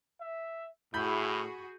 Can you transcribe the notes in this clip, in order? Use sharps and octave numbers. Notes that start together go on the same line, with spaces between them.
E5
A2 E4 F#4 G#4 B5 G6